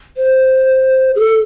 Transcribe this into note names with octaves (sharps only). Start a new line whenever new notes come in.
C5
G#4
A4